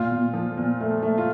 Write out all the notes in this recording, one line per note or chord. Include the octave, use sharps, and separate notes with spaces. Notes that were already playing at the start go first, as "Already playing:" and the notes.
Already playing: A#2 F4
A#2
F3
A#2
A3
A3
F4